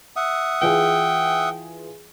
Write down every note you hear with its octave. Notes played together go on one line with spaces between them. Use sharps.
E5 F#5 D#6
E3 F4 G#4 G5